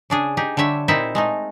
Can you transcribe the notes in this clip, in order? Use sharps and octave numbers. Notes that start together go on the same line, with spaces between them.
C#3 D4 G#4
D#4 G4 G#4
D3 G3 C#5 E5
A#2 C4 D#4 E4 E5
G#3 A3 D#4